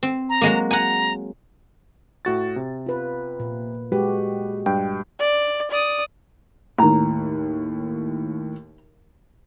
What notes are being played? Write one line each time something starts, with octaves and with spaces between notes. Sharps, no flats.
C4
A#5
F#3 G#3 A#3
F#5 G#5 A#5
A2 F#4 A6
C3
F4 B4
A#2
G#3 F#4 G4 B4
G2 G5
D5
D5 D#6
D#2 A2 A#5